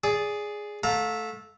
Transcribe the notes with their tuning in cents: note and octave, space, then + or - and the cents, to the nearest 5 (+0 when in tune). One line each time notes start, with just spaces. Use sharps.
G#4 +0 D5 -20
A3 -10 F5 +35 A#5 -10